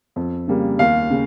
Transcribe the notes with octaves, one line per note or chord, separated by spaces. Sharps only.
F2
C#3 G3 A#3
D#2 F5
C#3